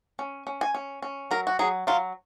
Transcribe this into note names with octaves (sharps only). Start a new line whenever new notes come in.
C#4
C#4
G#5
C#4
C#4
F#3 A#4
F#4
F#3 G#4
F#3 F4